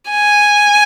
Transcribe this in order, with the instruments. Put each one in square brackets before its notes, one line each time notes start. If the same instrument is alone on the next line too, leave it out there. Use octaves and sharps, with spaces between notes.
[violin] G#5